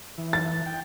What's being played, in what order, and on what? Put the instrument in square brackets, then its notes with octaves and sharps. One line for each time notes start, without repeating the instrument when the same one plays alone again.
[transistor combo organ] E3
[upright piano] A6
[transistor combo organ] G5